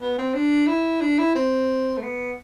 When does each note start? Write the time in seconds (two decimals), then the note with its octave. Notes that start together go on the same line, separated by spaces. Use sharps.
0.01 B3
0.18 C4
0.34 D4
0.67 E4
1.01 D4
1.19 E4
1.35 C4
1.98 A3
2.03 B3